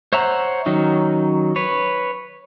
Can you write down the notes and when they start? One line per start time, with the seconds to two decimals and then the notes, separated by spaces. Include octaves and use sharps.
0.13 C5 C#5 E5 F#5 A#5
0.66 D#3 F#3 C#4 D#4
1.56 B4 C#5